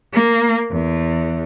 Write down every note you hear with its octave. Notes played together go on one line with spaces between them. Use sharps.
A#3
E2